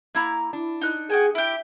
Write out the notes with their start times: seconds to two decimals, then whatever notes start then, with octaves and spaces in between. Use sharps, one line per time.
0.14 A#3 E4 A#5
0.53 D4 E4
0.81 D#4 F#6
1.10 F#4 G#4 G5 G#5
1.35 E4 G4 E5